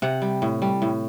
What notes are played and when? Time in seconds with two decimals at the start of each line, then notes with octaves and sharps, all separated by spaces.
0.02 C3 F#5
0.22 G3
0.42 A2
0.62 G3
0.82 A2